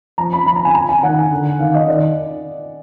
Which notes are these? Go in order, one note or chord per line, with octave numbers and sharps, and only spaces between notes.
F3 A#5
B5
F3 B5
A#5
G#5
A#5
G#5
D#3 F#5
D3
D#3 F5
D#5
D#3 D5